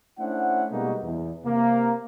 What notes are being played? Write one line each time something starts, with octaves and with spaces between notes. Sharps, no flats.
A3 C#4 D4 E4 C5 F#5
B2 G3 G#3 A#3 D#4 F#4
E2
C3 A#3